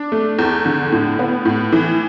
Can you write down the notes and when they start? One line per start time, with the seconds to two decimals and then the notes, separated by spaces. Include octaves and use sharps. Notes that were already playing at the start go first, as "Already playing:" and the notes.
Already playing: D4
0.12 A3
0.39 E2
0.66 D3
0.92 A2
1.19 B3
1.45 A2
1.73 E3